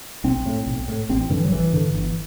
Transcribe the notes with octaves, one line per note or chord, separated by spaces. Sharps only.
B1 C4
A2
B1
A2
A1 C4
G2 D3 E3
F#3
A1 E3
G2 D3
G1